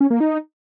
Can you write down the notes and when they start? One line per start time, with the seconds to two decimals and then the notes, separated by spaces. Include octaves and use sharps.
0.01 C#4
0.10 A#3
0.20 D#4